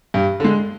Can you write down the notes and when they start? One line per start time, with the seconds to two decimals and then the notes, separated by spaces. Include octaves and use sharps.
0.14 G2
0.40 D3 G#3